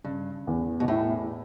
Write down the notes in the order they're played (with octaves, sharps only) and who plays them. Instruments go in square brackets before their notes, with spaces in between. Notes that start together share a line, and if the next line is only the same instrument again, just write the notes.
[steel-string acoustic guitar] G2 [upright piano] C#3
[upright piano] E2
[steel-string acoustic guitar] B2
[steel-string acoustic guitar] A2 [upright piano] E4